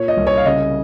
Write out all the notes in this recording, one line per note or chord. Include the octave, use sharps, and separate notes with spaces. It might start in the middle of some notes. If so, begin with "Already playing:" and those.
Already playing: A#2 C#5
D#5
C2
C#5
F5
C#3 D#5